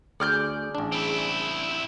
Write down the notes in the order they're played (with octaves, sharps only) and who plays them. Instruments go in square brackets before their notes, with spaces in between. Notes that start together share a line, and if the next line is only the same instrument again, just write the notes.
[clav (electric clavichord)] D2 [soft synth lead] G#4 [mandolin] D5 F6 G6
[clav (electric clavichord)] A1 D4
[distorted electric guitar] C4 E4